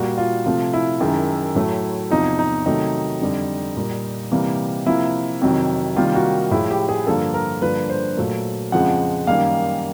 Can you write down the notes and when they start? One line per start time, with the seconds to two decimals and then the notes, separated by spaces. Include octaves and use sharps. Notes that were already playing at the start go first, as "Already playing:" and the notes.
Already playing: A#2 G3 A#3 F#4
0.18 F4
0.46 C3 F3 A3 F4
0.73 E4
1.00 F#2 D#3 G#3
1.55 A2 F#3 A3
2.11 E2 C3 F3 D#4
2.39 D#4
2.66 C3 D#3 F#3 A3 D#4
3.21 F2 D3 G3
3.76 A#2 G3 A#3
4.31 C3 E3 G3 A#3
4.86 C3 F3 A#3 E4
5.41 F2 C3 D#3 F#3
5.96 C3 D#3 G3 A#3 F4
6.15 F#4
6.51 A2 F3 G#3 E4
6.71 G4
6.89 G#4
7.07 G2 D3 F3 A#3 A4
7.34 A#4
7.62 G2 D3 F3 A#3 B4
7.90 C5
8.17 A#2 F#3 A3
8.72 F2 C#3 F3 G#3 F#5
9.27 F#2 D#3 G3 A#3 F5